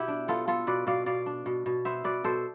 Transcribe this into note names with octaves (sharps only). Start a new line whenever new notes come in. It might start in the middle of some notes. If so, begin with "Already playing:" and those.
Already playing: B2 B3 E4 G4
D4
B3 F4 A4
B3 F4 A4
B2 B4 D5
B2 D5 F5
B2 D5 F5
D4
B2
B2
B3 C5 E5
B2 B4 D5
B2 A4 C5